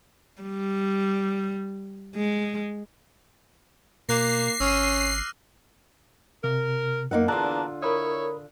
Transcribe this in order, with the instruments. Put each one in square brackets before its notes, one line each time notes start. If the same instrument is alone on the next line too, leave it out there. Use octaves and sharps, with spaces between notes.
[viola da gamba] G3
G#3
[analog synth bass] B2 [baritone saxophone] A#3 [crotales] D6 F#6 A#6 [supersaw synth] C7
[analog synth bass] G#1 [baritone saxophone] C#4 [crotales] E6 F6 D#7
[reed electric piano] C3 [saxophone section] A#4
[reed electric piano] F#2 [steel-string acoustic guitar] A#3 D#4 F#5
[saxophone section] E2 A#3 D4 [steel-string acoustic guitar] D3 F4 [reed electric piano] A5 A#5 F#6
[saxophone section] E4 C#5 [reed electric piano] A#4 B5 D#6